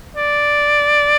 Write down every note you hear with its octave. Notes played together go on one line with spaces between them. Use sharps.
D5